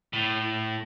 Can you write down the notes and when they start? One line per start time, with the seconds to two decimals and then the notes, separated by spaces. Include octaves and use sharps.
0.13 A2